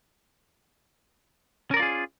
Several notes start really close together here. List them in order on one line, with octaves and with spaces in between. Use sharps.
C#4 A#4 D5 F4 G#4